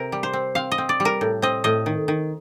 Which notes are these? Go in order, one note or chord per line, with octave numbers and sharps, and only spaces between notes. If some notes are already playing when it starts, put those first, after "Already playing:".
Already playing: C3 A#4
G3
C5
C4
C4 F5
D#5
C4
D5
G3
A#4
A2
C4 D#5
A2 D#5
D#3
D#3